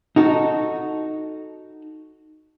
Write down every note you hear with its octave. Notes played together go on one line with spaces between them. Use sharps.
D#4 F#4 A4